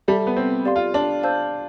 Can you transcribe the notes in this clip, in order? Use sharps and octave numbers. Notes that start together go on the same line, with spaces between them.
G3 A4 E5 A5
B3
C4
G4 D5 F5 C6
F4
D4
C5 F5 A5 E6 G6